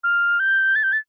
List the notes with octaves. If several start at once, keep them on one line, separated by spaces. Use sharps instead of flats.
F6
G6
A6
G6
A6